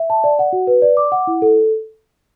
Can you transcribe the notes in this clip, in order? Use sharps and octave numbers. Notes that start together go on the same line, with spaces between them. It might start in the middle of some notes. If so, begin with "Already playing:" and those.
Already playing: E5
A5
D5
F#5
F#4
B4
D5
D6
F#5
E4
A4